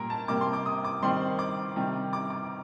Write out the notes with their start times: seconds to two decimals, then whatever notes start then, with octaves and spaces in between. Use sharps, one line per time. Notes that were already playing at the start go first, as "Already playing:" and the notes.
Already playing: A#2 G3 A#3 A#4
0.10 A5
0.28 C3 G3 A#3 D6
0.41 C6
0.53 D6
0.66 D#6
0.84 D6
1.02 D#3 G3 C4 C6
1.39 D6
1.76 C3 D#3 G3
2.13 D6
2.30 D6